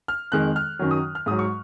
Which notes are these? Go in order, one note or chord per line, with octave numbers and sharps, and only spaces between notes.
F6
F2 D#3 G#3 F#6
F6
F#2 D#3 F#3
D#6
F6
G#2 F#3 D#6
C#6